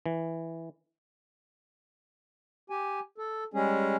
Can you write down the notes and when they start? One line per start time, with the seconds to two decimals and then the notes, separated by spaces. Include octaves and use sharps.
0.06 E3
2.70 G4 G#5
3.18 A4
3.54 G3 G#3 C#4 G#4